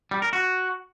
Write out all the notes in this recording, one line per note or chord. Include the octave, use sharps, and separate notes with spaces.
G3
A#4
F#4